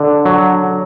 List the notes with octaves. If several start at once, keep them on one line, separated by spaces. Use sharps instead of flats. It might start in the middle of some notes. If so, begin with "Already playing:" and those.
Already playing: D3
F#3